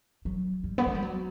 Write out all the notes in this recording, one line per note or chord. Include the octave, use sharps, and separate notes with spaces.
F#3
G3
B3
A3
G3
F#3